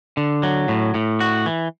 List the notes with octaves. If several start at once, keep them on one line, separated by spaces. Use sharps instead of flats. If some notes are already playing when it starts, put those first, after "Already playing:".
D3
F#3
A2
A2
F#4
E3